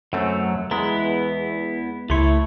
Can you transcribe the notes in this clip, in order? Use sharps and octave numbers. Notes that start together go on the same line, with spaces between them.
F#2 F#3 A3 C4
E2 G#3 B3 E4 A#5
C#2 A3 E4 C#5 C6